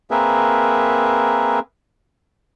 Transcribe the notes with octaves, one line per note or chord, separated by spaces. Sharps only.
A#3 C4 G#4 A#4 B4 E5